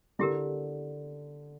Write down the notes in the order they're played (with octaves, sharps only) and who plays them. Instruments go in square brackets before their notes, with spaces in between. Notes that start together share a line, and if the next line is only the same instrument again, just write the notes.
[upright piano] D3 [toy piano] E4 G4 A#4